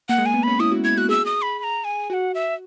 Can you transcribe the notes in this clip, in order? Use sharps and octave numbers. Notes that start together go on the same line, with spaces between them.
A#3 F#5
G#3
A#3 G#5
B3
C#4 B5
E4 D#6
F#4
E4 G#6
F#4 F#6
G#4 E6
D#6
B5
B5
A#5
G#5
F#4 F#5 G#5
E5